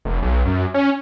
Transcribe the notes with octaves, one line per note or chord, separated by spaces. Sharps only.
F1
B1
F#2
C#4